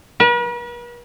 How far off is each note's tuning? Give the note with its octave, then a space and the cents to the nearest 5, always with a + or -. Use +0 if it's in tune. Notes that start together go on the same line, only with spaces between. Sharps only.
B4 -45